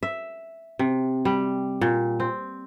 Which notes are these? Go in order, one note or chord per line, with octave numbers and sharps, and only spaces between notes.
E5
C3
G3
A#2
C4